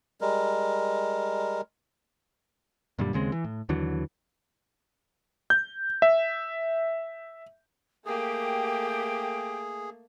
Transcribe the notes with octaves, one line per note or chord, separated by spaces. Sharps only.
G3 G#3 A#4
F#2 A#2 D3 G3
D#2 C#3 G#3 C4
E3
A2
D#2 D3 E3 F#3
G6
E5
A3 A#3 G4 G#4 G5